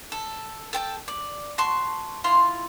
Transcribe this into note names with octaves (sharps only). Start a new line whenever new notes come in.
A4
A4 G5 A5
D5
F#4 A5 C6 C#6
E4 F4 C6